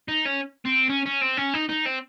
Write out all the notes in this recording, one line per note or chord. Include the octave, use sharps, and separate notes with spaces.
D#4
C#4
C4
C#4
C#4
C4
C#4
D#4
D#4
C4